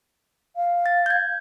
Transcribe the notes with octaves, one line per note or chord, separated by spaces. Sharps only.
F5
A6
G6 G#6